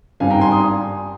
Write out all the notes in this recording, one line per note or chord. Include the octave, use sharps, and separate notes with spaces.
G#1 G2 D#3 G3 F5 G#5
G5 A#5
G#5 C6
C6 D#6